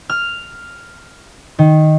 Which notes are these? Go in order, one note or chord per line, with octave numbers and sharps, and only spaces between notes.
F6
D#3